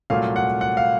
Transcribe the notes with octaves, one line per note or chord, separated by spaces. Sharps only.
C2 A#2 F#3 A3 F5
F#5
F#5
F5